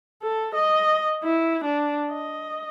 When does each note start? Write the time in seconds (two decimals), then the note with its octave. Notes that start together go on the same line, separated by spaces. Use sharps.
0.23 A4
0.55 D#5
1.24 E4
1.65 D4
2.12 D#5